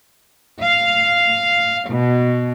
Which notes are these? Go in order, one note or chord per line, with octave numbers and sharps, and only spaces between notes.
F5
B2